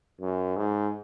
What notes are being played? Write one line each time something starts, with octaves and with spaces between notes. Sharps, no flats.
F#2
G#2